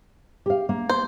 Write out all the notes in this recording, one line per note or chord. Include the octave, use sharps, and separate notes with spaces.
G4 F5
A#3
C5